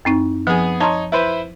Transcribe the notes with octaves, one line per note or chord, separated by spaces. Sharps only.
F#2 C4 D#4
F3 B3 G#4
D#4 C#5 A5 A#5 C6
E4 B4 C5